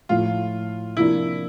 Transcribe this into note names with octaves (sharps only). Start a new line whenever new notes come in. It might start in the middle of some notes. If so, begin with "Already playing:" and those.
A2 F3 A3 F4
C3 F3 A#3 D4 E4